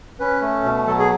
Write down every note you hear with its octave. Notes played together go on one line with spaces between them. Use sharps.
C#4 B4
A3
B2
F#3 A4
G#4